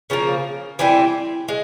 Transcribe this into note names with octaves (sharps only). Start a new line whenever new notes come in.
C#3 F3 A#3
E3 G3 C4 E4
G#3